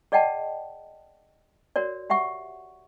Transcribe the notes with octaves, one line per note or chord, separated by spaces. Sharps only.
G#4 D5 D#5 F#5 G5 A5
F#4 A#4 C#5 D5
G4 E5 F#5 C#6